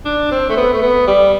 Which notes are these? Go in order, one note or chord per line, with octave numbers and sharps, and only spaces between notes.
D4
C4
A3
B3
A3
B3
G3